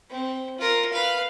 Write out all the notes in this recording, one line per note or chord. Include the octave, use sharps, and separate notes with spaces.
C4
F4 A#4
B4 F5